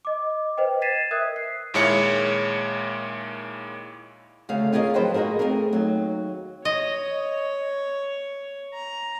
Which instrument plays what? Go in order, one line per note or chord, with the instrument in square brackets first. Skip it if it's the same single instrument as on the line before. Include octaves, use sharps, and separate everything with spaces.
[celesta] D#5 D6
B4 C5 D#5 G5
G#6 A6 B6 C7 D#7 E7
A#4 E5 D#6 E6 F#6 G#6
C7
[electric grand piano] D#2 A#2 G#3 E4 C#5 C#7
[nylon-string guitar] D2 C#3 A3 F5
C#4 F4 G#4 A#4 D#5
F3 F#3 E4 G4 B4 C5
A#3 D#4 F#4 G#4 A#4
A3 C4 D4 F4 G#4 A#4
D#2 F#3
[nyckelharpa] C#5 [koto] D#5
[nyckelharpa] A#5